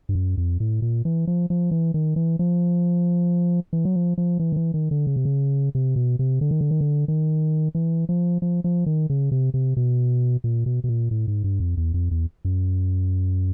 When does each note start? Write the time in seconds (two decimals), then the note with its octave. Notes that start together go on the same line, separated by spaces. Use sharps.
0.09 G2
0.15 F#2
0.37 F2
0.60 A2
0.82 A#2
1.05 E3
1.27 F3
1.50 F3
1.71 E3
1.94 D#3
2.16 E3
2.39 F3
3.73 E3
3.85 F#3
3.95 F3
4.18 F3
4.39 E3
4.52 D#3
4.56 E3
4.74 D#3
4.91 D3
5.07 C#3
5.16 C3
5.25 C#3
5.75 C3
5.96 B2
6.19 C3
6.41 D3
6.51 D#3
6.61 D3
6.71 D#3
6.81 D3
7.08 D#3
7.75 E3
8.09 F3
8.42 F3
8.64 F3
8.86 D#3
9.10 C#3
9.32 C3
9.54 C3
9.77 B2
10.44 A#2
10.66 B2
10.84 B2
10.89 A#2
11.11 A2
11.28 G#2
11.44 G2
11.60 F2
11.77 E2
11.94 F2
12.11 E2
12.45 F#2